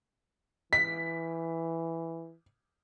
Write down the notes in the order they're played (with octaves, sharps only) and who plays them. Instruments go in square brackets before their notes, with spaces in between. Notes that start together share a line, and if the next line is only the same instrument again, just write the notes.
[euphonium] E3 [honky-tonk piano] B6